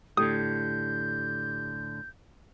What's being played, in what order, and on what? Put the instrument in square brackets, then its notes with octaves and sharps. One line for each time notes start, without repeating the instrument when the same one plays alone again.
[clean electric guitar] A2 D3 [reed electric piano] A3 G4 [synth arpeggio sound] D#6 [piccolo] G6